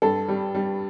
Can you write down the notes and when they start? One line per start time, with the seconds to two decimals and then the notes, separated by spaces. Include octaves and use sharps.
0.02 G2 A4
0.28 G3
0.55 G3